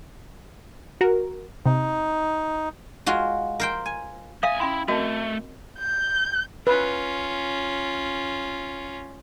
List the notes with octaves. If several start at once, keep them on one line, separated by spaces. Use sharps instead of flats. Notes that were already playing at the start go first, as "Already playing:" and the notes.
F#4 A#4
C3 D#4
G#3 F4 F#4
A#4 C5 G5
G#5
C2 E5 F5 G#5 D#6
C#4 E4 G5 C6
A3 C4 F#4 A#4 D#5
G6
C#4 F4 B4